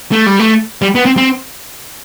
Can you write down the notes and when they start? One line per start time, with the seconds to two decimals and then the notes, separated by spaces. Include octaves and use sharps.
0.12 A3
0.26 G3
0.39 A3
0.82 G3
0.95 B3
1.06 C4
1.17 C4